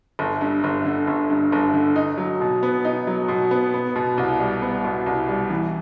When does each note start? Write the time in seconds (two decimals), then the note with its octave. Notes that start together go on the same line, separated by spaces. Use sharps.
0.19 G1
0.41 G2
0.64 G1
0.85 D3
1.07 G1
1.30 G2
1.52 G1
1.74 D3
1.96 D#4
2.18 F#3
2.41 B2
2.63 B3
2.85 D#4
3.07 F#3
3.28 B2
3.51 B3
3.74 B3
3.96 B2
4.18 C2
4.40 G3
4.62 B3
4.85 B2
5.06 C2
5.29 G3
5.50 E3